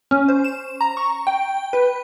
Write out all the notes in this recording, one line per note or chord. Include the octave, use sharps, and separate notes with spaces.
C#4
C5
E7
A#5
C#6
G5
B4